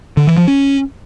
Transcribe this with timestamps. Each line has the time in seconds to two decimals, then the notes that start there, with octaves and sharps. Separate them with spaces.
0.17 D3
0.27 E3
0.37 F3
0.48 C#4